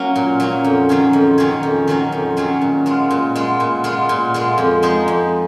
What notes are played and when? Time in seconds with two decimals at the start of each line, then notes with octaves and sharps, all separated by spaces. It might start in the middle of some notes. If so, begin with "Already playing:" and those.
Already playing: F#3 A#3 C#4
0.16 A#2
0.40 F#3 A#3 C#4
0.65 F2
0.89 D#3 F#3 C#4 G#4
1.13 F2
1.38 D#3 F#3 C#4 G#4
1.63 F2
1.88 D#3 F#3 C#4 G#4
2.12 F2
2.37 D#3 F#3 C#4 G#4
2.61 A#2
2.86 G#3 B3 F4
3.11 A#2
3.35 G#3 B3 F4
3.60 A#2
3.84 G#3 B3 F4
4.09 A#2
4.34 G#3 B3 F4
4.58 F2
4.83 F3 G#3 D#4 G#4
5.08 F2